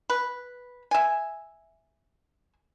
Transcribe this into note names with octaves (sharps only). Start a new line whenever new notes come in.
B4
E5 G#5